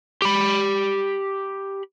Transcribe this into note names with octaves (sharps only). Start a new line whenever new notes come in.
G4 B5